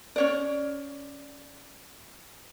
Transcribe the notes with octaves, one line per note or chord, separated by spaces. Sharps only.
C#4 C#5 D5